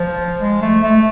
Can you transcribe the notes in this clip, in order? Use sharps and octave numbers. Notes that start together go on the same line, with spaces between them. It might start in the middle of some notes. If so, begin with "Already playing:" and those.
Already playing: F3
G#3
A3
A3